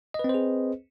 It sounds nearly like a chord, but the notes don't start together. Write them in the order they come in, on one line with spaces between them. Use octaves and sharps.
D#5 B4 C4 C5 G#4